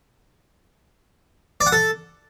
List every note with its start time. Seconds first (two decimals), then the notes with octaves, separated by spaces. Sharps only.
1.61 D5
1.67 F#5
1.72 A4